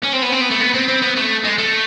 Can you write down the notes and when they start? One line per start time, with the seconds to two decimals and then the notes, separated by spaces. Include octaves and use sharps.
0.04 C#4
0.13 C4
0.22 B3
0.32 C4
0.41 B3
0.50 A3
0.60 B3
0.74 C4
0.88 C4
1.02 B3
1.16 A3
1.44 G#3
1.58 A3